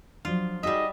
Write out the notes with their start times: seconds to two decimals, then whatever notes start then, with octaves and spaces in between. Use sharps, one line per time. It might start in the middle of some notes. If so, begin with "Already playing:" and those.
0.25 F3 F#3 D4 F4
0.63 G3 D#4 F#4 G#4 D#5 E5